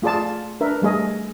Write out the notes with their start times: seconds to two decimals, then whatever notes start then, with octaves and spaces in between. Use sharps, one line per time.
0.02 A3 F4 G#4 D5 A5
0.61 D4 A#4 B4 E5
0.82 G3 A3 G#4 D#5